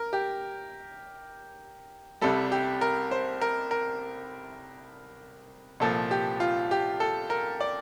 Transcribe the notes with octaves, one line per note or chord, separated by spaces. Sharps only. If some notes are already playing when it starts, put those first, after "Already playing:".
Already playing: A#4
G4
C2 C3 G3 A4
G4
A#4
C5
A#4
A#4
C2 A#2 F3 A4
G4
F4
G4
A4
A#4
D5